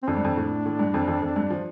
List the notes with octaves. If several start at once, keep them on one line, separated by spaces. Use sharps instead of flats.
C4
F2 D4
G2
F2
A2
A2
G2
F2
F2
F2
G2
F3